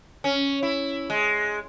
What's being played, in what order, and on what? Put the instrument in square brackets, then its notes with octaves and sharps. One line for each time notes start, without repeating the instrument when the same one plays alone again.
[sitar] C#4
E4
G#3